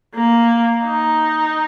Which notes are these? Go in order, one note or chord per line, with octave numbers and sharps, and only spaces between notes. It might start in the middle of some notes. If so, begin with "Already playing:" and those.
A#3
D#4